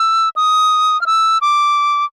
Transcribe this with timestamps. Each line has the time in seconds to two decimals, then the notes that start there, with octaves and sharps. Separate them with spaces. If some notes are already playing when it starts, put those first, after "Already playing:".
Already playing: E6
0.36 D#6
1.01 F6
1.06 E6
1.42 D6